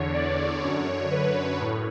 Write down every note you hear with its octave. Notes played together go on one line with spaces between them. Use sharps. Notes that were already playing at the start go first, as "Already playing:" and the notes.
Already playing: E2 D3 C#5
D5
F#2 D3 C#5
B4
A2